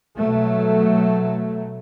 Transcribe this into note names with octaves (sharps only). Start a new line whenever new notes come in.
B2 F#3 A3